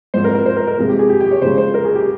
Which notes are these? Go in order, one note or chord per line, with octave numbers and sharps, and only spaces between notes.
G#2 F3 C4 C5
A#4
A#4
C5
A#4
A#4
C3 F3 G#3 C4
G4
G#4
G4
G4
C#5
C#3 F3 G#3 C5
C5
A#4
G#4
G4